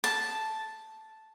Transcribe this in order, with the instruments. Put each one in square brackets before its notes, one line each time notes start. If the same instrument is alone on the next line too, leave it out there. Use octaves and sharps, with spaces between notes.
[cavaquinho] A5